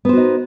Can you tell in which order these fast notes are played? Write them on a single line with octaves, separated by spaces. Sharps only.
B3 C5 F#4 D#4